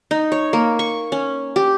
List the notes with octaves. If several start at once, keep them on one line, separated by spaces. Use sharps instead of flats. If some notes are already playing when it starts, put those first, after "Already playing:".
D#4
C#5
A#3
C#6
C#4
G4